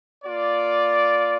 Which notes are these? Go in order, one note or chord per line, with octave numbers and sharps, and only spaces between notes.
A#3 F4 D5